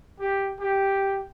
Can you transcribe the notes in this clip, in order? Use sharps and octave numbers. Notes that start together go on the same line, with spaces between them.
G4
G4